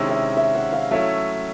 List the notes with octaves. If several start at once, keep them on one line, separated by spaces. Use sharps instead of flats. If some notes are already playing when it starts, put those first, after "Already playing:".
Already playing: C3 D#3 G#3 C#4 E4
E5
E5
F#5
F5
F#3 A3 C#4 E4 E5